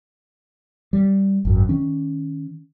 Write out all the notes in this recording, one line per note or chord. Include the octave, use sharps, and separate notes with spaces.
G3
G#1 F#2
D#3 C#4